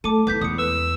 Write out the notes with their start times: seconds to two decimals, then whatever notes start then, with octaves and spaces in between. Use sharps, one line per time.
0.04 A3 A4 D6 D#7
0.27 D#3 B3 E4 D6 G6 B6
0.41 E2 C#3 G#3 D#6 C#7
0.58 B4 E6